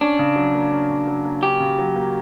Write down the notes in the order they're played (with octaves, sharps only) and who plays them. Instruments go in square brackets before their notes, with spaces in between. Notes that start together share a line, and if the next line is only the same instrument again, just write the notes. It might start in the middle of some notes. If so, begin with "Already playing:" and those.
[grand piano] C#4 [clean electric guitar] D4
[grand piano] C#3
F#3
A#3
C#4
C#3
F#3
A#3
[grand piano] C#4 [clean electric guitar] G4
[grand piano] C#3
F#3
A#3